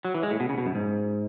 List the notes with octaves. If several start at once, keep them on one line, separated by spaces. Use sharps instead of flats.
F#3
E3
G#3
A2
B2
C#3
B2
F#2
G#2